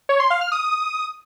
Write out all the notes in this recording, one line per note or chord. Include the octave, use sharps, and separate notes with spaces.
C#5
C6
F5
F6
D#6